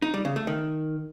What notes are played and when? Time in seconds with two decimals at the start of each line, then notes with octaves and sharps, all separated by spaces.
0.02 D#4
0.14 G3
0.25 C#3
0.36 A3
0.47 D#3